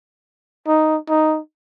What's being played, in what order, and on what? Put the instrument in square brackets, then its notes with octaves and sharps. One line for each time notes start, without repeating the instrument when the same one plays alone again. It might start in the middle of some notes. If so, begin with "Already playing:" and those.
[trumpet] D#4
D#4